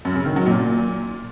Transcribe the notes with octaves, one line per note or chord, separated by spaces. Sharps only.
F#2
C#3
D#3
F#3
A#2